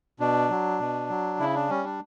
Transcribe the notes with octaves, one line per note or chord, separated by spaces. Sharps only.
B2 D4
F#3
B2
F#3
C#3 E4
D4
G3 C#4
D4